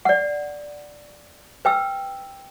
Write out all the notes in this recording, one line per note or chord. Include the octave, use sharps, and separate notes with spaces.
D5 F#5
B4 G5 E6